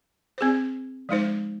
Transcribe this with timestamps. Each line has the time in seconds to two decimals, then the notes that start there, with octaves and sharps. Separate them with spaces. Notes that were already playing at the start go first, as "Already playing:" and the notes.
0.38 C4 G#4 C5
1.09 F3 G#3 D#4 C5